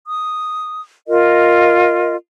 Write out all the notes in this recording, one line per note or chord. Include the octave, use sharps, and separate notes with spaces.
D#6
F4 A#4 D#5